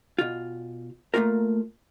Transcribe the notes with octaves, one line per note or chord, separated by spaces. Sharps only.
B2 F4
A3 A#3 C#4 D#4 F4 A#4